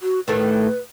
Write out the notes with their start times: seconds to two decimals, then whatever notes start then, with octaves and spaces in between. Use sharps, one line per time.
0.01 F#4
0.28 A2 D#3 A3 B4